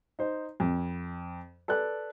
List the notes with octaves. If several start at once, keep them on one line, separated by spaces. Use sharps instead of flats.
D#4 C5
F2
A4 B4 D5 F#6